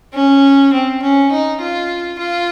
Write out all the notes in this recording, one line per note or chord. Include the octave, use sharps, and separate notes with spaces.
C#4
C4
C#4
D#4
F4
F4